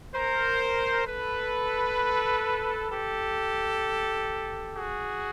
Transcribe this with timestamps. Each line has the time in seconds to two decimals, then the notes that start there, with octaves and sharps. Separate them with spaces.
0.14 A#4 C5
1.07 A4 B4
2.91 G4 A4
4.76 F#4 G#4